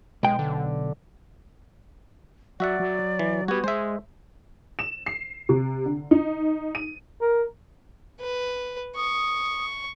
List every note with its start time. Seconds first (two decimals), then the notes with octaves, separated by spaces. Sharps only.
0.23 B1 G#3 G5
0.39 D3
2.60 F#3 F#4 D5 E5 F#5
2.80 F#3
3.19 E3
3.48 G3 B3 F#4 G#6
3.64 G#3 G#4 C5 E5
4.79 E7
5.06 C7
5.49 C3
5.86 D3
6.11 D#4
6.75 D#7
7.21 A#4
8.21 B4
8.96 C#6 D#6